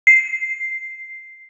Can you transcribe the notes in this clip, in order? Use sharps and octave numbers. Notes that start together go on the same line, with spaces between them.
C7